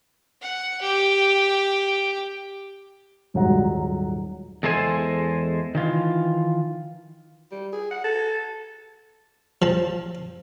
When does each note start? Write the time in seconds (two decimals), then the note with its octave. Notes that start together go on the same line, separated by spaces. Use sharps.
0.42 F#5
0.81 G4
3.34 D#1 G#2 F#3 G3 F#5 A#5
4.63 E2 G#3 A4 C5 G#5
5.75 D#3 E3 F4
7.51 G3
7.73 G#4
7.91 F#5
8.04 A4
9.62 F3 A5